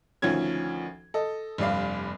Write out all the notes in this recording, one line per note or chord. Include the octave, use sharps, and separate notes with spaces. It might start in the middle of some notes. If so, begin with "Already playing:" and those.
D2 D#3 F3 C#4 G#6
A4 D#5
F1 G2 D5 F5